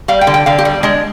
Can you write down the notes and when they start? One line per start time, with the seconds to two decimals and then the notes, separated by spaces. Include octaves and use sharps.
0.08 G3 F5
0.21 G5
0.27 D3
0.34 G5
0.46 D3 F5
0.58 G4
0.65 G3
0.83 G#3 D4